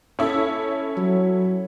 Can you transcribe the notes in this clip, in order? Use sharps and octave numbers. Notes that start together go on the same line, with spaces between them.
C#4 E4 A4
F#3